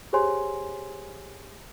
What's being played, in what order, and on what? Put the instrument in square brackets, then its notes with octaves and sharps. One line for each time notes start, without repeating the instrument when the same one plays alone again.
[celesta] G4 G#4 C5 C#5 G#5 C6